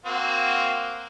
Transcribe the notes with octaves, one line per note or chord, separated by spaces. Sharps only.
A#3 C4 F#4